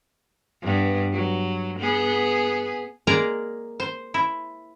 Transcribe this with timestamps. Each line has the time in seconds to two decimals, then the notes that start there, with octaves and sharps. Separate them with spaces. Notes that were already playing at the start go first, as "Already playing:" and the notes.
0.62 G2 B3
1.12 F#3
1.79 B3 G#4
3.07 G#3 A#3 G#4 A#4 D5 A#5
3.80 C5
4.14 E4